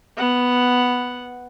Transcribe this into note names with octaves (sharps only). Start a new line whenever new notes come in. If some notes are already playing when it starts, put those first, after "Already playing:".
B3 F#5